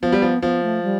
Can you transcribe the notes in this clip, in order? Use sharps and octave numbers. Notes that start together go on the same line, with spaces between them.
F3 B3
G3
F3
F3 B3
A3
G3